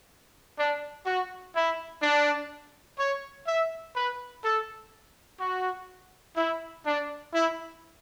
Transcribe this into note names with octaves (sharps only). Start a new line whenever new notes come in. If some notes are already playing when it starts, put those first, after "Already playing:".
D4
F#4
E4
D4
C#5
E5
B4
A4
F#4
E4
D4
E4